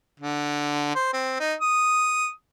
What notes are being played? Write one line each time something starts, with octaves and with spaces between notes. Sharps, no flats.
D3
C5
C4
D#4
D#6